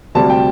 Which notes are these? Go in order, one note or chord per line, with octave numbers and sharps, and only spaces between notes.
D2 C3 G3 A5
G5